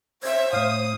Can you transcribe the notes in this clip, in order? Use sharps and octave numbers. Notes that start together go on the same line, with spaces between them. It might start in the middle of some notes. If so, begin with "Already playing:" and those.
C5 C#5 E5 G#6
A2 A3 F5 D#6 F6 C7